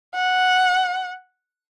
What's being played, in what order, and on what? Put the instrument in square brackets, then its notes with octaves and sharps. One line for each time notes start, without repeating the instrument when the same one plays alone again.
[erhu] F#5